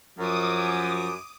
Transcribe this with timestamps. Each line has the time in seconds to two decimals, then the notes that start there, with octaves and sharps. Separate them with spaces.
0.19 F#2 F3 D6 D#6